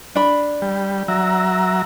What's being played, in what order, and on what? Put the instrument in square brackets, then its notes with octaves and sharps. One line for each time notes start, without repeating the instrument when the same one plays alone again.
[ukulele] D4 B5
[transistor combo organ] G3
F#3 E5 A#5